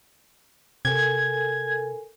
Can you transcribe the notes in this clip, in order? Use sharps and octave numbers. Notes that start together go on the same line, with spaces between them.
C3 A4 A#4 G#5 G#6